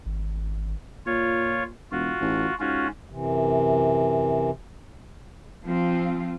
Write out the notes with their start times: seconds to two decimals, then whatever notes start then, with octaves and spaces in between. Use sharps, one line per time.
0.06 G#1
1.06 A#2 F4 C#5
1.92 E1 F4 F#4
2.21 A1
2.60 G#2 C#4 F4 F#4
3.10 F#2 C3 E3
5.64 F3 C4 F4